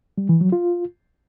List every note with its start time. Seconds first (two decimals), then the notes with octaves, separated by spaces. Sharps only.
0.18 G3
0.29 E3
0.41 F#3
0.52 F4